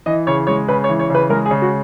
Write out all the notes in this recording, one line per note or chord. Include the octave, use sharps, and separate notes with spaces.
E3 D#5
C#3 C#5
G#3 C#5
C#3 B4
C#5
E3
C#5
C#3 B4
G#3 A#4
G#4
C#3
F#4